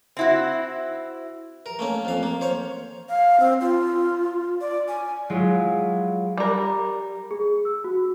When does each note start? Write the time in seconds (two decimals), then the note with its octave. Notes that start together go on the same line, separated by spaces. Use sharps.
0.17 C4 E4 F#4
1.66 A#4
1.79 A3 A#3 C#4
2.05 F2 F5
2.23 A#3
2.41 C5 C#5 F5
3.09 F5
3.40 C4
3.61 F4
4.61 D5
4.88 G#5
5.29 F#3 G#3 E4 F4
6.38 G3 A#4
7.31 G#4
7.65 E6
7.84 F#4